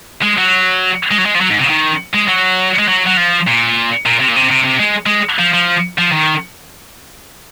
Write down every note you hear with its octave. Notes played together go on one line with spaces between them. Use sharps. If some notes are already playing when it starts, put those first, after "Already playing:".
G#3
F#3
G#3
F#3
G#3
F3
F#3
G#2
C3
C#3
D#3
G#3
F#3
G#3
F#3
F#3
F3
A#2
A#2
C3
A#2
C3
C3
C3
G#3
G#3
F3
F3
F3
D#3